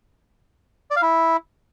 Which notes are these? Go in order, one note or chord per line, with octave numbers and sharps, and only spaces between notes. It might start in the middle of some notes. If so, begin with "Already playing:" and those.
D5
F5
E4